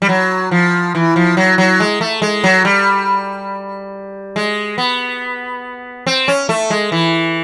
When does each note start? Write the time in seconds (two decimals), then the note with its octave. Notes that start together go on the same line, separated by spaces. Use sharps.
0.02 G3
0.09 F#3
0.51 F3
0.95 E3
1.16 F3
1.37 F#3
1.58 F#3
1.80 G#3
2.01 A3
2.22 G#3
2.44 F#3
2.65 G3
4.36 G#3
4.78 B3
6.07 C4
6.28 C#4
6.49 A3
6.70 G#3
6.92 E3